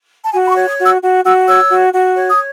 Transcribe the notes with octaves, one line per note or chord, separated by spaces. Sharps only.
A5
F#4 G#5
B5
C#6
C#5
D#6
F#4
E6
F#4
F#4 E6
C#5 E6
F#4
F#4
C#5
D#6